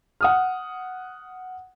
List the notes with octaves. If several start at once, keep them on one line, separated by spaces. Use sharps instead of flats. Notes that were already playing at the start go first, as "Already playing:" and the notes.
F#5 D#6 F6